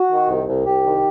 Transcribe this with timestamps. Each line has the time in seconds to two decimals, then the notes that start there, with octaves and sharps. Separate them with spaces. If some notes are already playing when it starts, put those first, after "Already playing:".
Already playing: F#4
0.11 D#3
0.29 C2
0.48 C2
0.66 C2 G4
0.85 D#3